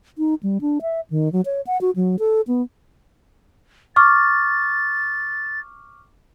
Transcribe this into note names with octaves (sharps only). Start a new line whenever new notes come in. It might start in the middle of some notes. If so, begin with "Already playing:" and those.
D#4
G3
D4
E5
D#3
F#3
C#5
F#5
F#4
F#3
A4
B3
C#6 D6 F6 A6